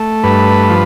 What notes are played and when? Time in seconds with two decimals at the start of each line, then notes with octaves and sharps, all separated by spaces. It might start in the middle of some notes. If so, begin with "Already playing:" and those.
Already playing: A3
0.23 G2 B4
0.70 F3